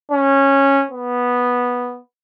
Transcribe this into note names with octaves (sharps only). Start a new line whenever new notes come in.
C#4
B3